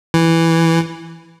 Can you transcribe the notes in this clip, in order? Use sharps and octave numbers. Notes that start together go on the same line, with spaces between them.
E3